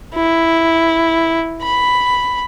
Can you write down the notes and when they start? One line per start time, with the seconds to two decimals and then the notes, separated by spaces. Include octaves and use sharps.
0.14 E4
1.62 B5